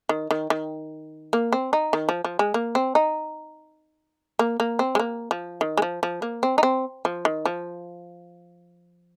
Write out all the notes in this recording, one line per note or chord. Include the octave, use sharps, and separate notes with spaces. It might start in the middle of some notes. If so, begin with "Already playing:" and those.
D#3
D#3
D#3
A#3
C4
D#4
D#3
F3
F3
G#3
A#3
C4
D#4
A#3
A#3
C4
G#3
A#3
F3
D#3
G#3
F3
F3
A#3
C4
D#4
C4
F3
D#3
F3